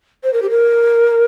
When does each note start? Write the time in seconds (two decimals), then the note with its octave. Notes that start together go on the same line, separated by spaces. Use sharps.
0.24 C5
0.33 A#4
0.42 G4
0.50 A#4